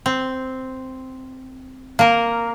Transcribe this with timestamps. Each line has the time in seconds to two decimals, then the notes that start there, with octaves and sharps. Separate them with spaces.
0.06 C4
1.99 A#3 A#4